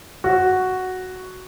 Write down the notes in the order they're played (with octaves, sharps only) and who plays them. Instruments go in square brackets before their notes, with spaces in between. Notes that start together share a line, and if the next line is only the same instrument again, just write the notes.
[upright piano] F#4